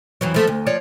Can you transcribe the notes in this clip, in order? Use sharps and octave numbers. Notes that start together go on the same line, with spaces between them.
F2 E3 F#3
F3 A3
D2
F3 C#5 D5